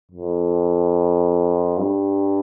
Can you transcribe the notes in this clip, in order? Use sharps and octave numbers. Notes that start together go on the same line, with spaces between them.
F2
G2